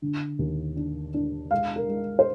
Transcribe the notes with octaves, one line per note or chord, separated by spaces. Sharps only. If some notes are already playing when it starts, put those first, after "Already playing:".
D3
D#2
D4
D4
G#3 F5
A#4
G#3
C5